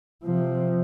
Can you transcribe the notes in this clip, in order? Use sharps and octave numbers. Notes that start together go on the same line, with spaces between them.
C3 F3